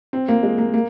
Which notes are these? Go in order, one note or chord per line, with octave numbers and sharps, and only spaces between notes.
C4
A#3
G#3
A#3
A#3